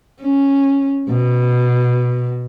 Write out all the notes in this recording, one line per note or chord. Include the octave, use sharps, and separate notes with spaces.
C#4
B2